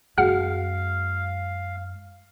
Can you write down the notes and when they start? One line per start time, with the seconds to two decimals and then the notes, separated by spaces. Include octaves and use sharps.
0.18 F#2 G#3 F#4 G#4 F5 F#5 F6